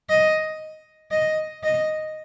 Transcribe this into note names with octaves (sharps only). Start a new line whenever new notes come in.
D#5
D#5
D#5